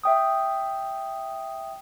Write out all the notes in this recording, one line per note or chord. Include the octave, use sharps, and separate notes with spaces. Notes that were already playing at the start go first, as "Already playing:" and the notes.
E5 G5 D#6